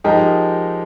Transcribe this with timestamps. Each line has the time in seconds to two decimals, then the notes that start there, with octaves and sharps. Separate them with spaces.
0.04 F3 G#3 D#4 G4 A#4